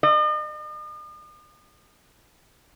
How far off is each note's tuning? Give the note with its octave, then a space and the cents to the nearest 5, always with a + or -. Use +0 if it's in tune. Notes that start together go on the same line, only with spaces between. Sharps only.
D#5 -45